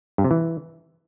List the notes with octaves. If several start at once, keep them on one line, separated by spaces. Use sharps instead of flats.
G2
C3
E3